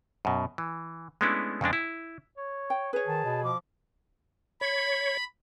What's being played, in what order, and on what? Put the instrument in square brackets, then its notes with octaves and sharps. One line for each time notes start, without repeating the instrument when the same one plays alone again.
[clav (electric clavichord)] F#2 B2
E3
G#3 A3 B3 C#4 D4 E4
F2 C#3 G#3 D4
E4
[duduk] C#5
[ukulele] G5
[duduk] G#4 [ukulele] B4 C#5
[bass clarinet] D#3 [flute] A5
[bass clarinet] B2
[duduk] F3 [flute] D6
[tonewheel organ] C#5 [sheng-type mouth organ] B5